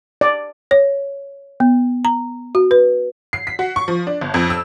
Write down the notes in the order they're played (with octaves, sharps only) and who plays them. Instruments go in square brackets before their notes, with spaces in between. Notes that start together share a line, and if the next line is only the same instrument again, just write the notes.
[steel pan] D5
[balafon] C#5
B3
A#5
F#4
B4
[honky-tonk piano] C7
B6
F#4
C#6
F3
D4
G1
F2
E6